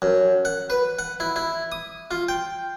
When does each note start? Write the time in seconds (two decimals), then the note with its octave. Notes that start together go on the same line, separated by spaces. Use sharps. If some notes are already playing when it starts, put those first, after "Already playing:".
0.02 F#2
0.45 F#5
0.70 B4
0.99 F#5
1.20 E4
1.36 E4
1.72 D#6
2.11 F4
2.28 G5